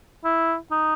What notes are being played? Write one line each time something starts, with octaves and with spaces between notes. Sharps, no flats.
E4
D#4